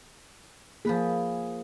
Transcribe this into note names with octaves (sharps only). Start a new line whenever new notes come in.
F3 A#3 G#4 B4 B5